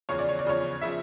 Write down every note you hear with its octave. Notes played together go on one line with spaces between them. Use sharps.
E2 C#3 F3 C#5
D5
C#5
D5
E2 C#3 F3 C#5
C#3 F3 E5